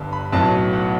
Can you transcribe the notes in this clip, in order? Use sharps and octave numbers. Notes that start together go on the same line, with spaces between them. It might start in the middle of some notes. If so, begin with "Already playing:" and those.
Already playing: G1 G2
B5
B1 A2 F#3 B3 A5
F#5